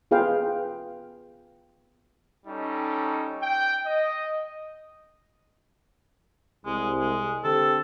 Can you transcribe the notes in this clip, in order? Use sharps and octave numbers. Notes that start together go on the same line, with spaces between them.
B3 F4 G#4 B4 F5 G5
G3 C#4 D#4 G4 A4
G5
D#5
C2 G#3
G#3
D3 C4 G4 A4